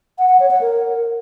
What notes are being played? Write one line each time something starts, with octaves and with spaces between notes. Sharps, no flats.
F#5
F#5
C#5
F#5
A#4